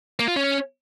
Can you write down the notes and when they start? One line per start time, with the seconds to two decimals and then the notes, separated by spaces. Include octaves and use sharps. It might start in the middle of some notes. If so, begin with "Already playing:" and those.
0.19 A#3
0.28 F4
0.36 C#4